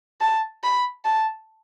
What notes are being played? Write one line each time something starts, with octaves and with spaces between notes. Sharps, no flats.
A5
B5
A5